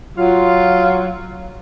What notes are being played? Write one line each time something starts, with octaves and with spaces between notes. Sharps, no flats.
F#3 F4